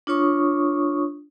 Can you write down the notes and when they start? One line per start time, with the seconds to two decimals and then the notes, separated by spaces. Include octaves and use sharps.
0.07 D4 F4 C#5 C#6 D#6